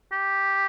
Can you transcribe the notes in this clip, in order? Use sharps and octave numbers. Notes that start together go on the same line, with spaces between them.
G4